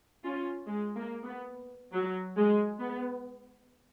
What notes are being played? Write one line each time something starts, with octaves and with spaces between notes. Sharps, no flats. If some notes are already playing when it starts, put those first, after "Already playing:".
C#4 F4
G#3
A#3
B3
F#3
G#3
B3